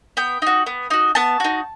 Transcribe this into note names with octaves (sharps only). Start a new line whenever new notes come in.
B3 G5
D#4 F#4
B3
D#4 F#4
B3 A5
D#4 F#4